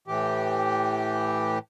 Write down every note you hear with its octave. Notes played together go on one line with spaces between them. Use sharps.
A2 E3 G4